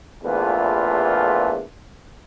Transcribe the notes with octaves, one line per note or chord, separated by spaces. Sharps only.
A#1 E2 A3 F4 B4